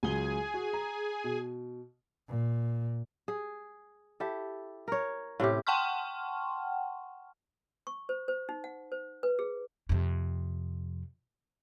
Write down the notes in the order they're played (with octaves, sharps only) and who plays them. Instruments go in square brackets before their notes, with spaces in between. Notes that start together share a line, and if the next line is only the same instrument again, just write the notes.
[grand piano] C#2 F#3 G7 [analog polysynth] G#4 G#5
[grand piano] F#4
A#5
B2
[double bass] A#2
[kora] G#4
E4 G4 A4
A#4 C#5
A2 C3 C#4 G4
[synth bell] F#5 G5 A5 C6 C#6 F6
[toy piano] C#6
C5
C5
D#4
F#5
C5
B4
G#4
[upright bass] F2 C3